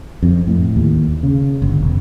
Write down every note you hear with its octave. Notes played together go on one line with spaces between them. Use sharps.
F2
A2
D#2
C#3
G1
E1